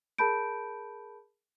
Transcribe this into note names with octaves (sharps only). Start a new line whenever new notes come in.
G#4 A#4 A5 B5 G6 D7